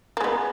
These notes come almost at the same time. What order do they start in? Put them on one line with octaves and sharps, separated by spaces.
A#3 G#3 B3